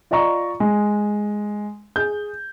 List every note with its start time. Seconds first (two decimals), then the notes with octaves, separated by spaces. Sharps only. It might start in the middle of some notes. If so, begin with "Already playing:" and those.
0.11 F4 D5 D#5 A#5 C#6
0.60 G#3
1.96 G#4 G6